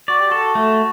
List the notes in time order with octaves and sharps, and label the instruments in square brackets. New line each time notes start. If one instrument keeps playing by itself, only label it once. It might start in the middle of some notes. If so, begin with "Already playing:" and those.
[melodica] F#4 [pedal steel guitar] D5
[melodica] G4
[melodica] F#4 [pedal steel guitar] A4
[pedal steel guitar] A3